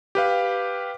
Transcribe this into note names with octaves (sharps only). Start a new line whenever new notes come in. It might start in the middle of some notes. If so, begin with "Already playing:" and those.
G4 B4 F5